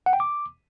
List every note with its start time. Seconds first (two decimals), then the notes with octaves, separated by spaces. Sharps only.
0.06 F#5
0.13 G5
0.20 D6